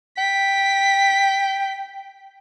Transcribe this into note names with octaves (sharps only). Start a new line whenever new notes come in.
G5 B6